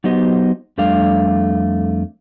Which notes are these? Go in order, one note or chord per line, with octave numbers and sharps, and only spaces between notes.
F#3 B3 D#4 G4 C5 D#5
F2 G3 A3 D4 F5